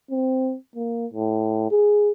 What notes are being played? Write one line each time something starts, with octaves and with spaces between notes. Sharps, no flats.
C4
A#3
A2
G#4